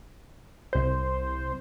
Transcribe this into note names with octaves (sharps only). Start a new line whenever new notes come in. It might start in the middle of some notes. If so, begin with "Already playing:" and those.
C2 C5